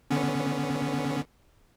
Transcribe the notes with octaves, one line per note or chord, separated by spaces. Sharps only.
D3 B3 C#4